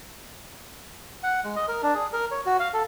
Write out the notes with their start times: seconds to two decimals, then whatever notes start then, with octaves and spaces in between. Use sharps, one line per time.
1.23 F#5
1.44 G#3
1.56 D#5
1.68 A#4
1.83 D4
1.95 G#4
2.13 A#4
2.31 C#5
2.46 F#4
2.60 F5
2.74 A4